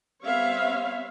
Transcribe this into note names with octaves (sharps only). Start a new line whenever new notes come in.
G3 B3 C4 C#5 E5 F5